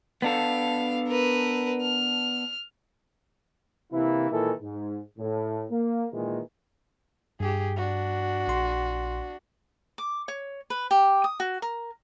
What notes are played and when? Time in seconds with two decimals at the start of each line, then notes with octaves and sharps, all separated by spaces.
0.22 B3 D4 A4 F5
1.07 A#4 B4
1.81 F6
3.92 C3 E3 A#3 E4
4.31 A#2 D#3 E3 G#3 E4 A4
4.61 G#2
5.18 A2
5.71 A#3
6.12 A#2 D#3 E3 G#3
7.40 G2 G4 G#4
7.77 D4 F#4
8.48 A#1 C6
9.98 D6
10.28 C#5
10.70 B4
10.91 G4
11.24 D#6
11.40 F#4
11.62 A#4